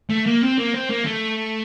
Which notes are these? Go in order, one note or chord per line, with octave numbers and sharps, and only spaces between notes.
A3
A#3
C4
A#3
C4
A#3
A3